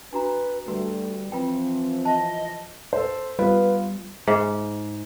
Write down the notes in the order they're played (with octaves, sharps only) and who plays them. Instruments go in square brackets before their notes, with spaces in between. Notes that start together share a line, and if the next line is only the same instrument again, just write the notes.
[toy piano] D4 F#4 A#5 [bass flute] B4
[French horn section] D2 A3 [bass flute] G3 [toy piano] F#4 B4
[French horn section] E3 F3 [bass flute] C4 [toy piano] F4 B4 G5
[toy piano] C5 A5 [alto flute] D#5
[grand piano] A4 C5
[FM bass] G3 [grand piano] B3 F4 [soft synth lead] B4
[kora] G#2